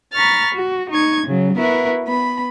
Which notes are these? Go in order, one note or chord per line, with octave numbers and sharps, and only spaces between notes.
A#5 B5 C#6 F6 A6
F#4
D#4 C#6 G#6
C#3 F#3
B3 E4 F#4 A#4 B4
B3 B5